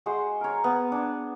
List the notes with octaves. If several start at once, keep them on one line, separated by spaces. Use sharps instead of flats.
G#3 F#4 G#4 C5
A#4 C#5
B3
D4